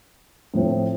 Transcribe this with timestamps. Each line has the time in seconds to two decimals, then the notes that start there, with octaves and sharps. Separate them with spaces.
0.54 A2 F3 C4